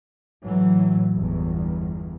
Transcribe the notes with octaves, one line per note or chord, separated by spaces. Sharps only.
A2 E3 F#3
G1 E2